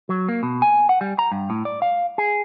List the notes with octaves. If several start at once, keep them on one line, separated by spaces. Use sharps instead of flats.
F#3
A#3
B2
G#5
F#5
G3
A#5
G2
A2
D5
F5
G#4